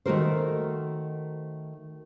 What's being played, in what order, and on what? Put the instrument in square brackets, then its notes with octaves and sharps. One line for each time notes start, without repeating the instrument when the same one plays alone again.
[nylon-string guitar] D#3 A3 F#4 A4 A#4 C5